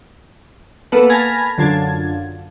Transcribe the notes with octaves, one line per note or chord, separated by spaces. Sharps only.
A#3 B3 A4 B4
G#5 A5 B5 F6 G#6 A#6
F#2 D3 F4 A5 G#6